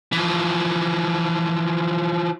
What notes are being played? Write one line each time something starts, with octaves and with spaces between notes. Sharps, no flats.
E3 F3